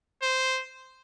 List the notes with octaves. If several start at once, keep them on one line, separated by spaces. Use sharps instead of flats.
C5